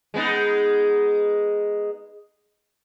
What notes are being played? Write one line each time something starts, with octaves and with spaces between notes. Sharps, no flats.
G#3 B3 D#4